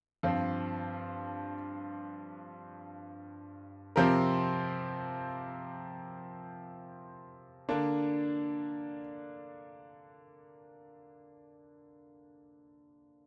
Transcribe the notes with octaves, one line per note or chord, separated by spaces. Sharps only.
G2 F3 C4 F4
C3 F3 C4 G4 A#4
D3 A#3 D4